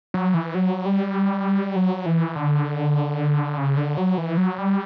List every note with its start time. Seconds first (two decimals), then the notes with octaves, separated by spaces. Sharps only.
0.14 F#3
0.34 E3
0.55 F#3
0.86 G3
1.76 F#3
2.06 E3
2.36 D3
3.58 C#3
3.77 D3
3.97 F#3
4.18 E3
4.37 F#3
4.58 G3